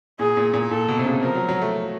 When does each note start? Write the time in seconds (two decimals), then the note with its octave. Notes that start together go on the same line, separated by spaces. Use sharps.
0.19 A#2 G#4
0.37 A#2
0.54 A#2
0.71 A#2 A4
0.88 B2
0.99 C3
1.06 C#3
1.22 F3 A#4
1.35 F#3
1.49 F#3
1.62 A3